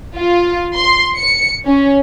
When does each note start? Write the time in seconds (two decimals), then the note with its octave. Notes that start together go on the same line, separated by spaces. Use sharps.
0.17 F4
0.74 C6
1.16 C#7
1.65 C#4